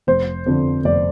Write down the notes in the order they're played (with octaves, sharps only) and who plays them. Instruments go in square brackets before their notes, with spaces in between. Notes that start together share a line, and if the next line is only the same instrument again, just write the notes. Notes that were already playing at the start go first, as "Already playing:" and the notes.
[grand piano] F1 C5
F2 D3
F1 D5